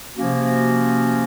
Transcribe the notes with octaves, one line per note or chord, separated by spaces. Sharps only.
C3 F3 A#3 C#4 F#4